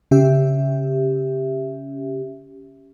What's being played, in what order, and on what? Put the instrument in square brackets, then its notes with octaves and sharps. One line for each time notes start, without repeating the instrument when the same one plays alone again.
[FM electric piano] C#3 C#4 G4 E5